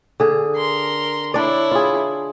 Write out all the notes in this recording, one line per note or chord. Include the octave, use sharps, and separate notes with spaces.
D3 G#4
A#4 C6
D4 E4 C#5 D5
F4 G#4